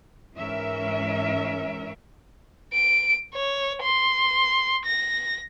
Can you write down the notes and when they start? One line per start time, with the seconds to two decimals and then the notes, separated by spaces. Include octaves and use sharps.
0.36 G#2 E3 C#4 A#4 E5
2.73 D7
3.34 C#5
3.82 C6
4.85 A#6